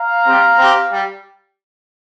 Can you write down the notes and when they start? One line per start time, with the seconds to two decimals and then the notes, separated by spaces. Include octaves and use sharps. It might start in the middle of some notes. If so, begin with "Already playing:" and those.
Already playing: F5 A#5
0.25 G3 C4 G4
0.58 C4 G4
0.90 G3